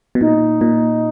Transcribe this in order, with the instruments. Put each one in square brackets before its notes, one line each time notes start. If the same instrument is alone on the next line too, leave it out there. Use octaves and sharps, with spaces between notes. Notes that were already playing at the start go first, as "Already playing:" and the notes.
[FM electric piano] B2
[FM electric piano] A#2 [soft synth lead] D#4
[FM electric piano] A#2